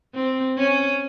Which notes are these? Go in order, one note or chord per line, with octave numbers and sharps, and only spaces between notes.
C4
C#4